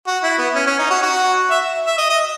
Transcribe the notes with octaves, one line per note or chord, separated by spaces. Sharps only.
F#4
E4
B3
C#4
C#4
D#4
F#4
F#4
E5
E5
D#5
D#5